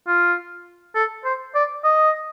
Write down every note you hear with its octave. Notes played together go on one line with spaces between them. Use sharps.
F4
A4
C5
D5
D#5